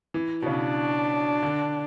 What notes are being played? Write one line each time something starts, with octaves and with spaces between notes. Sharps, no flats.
E3
B2
C#3 D4
D3